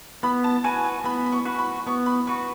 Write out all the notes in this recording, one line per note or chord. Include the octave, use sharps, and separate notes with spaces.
B3 B5
A5
F#4 B4 G#5
G#5
B3 B5
B5
C#6
F#4 B4
B5
B3 C#6
B5
F#4 B4 C#6